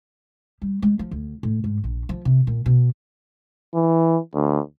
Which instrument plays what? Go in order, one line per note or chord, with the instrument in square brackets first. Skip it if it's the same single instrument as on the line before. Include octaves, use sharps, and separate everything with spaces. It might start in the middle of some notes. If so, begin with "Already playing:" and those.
[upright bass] G3
G#3
F3
D2
A2
G#2
A#1
F3
C3
A#2
B2
[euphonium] E3
D2